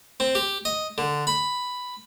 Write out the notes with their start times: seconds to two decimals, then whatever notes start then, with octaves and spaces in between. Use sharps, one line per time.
0.20 C4
0.35 G4
0.65 D#5
0.98 D3
1.27 B5